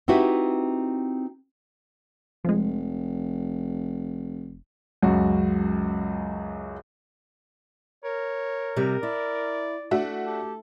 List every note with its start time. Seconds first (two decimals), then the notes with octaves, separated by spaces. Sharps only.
0.08 C4 D#4 E4 F#4 G4 B4
2.45 F1 F3 G#3
5.02 C#2 F#2 F#4
8.04 A#4 C#5
8.76 C3 G3
9.03 E4 D5
9.91 A3 D4 F#4 E5
10.26 G4 A4